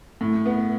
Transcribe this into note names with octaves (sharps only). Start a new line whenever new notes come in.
A2
B3